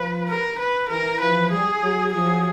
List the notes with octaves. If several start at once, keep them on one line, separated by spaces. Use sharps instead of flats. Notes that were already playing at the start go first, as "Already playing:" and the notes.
Already playing: F3 B4
A#4
B4
E3 A#4
F3 B4
G3 G#4
F#3
F3 G#4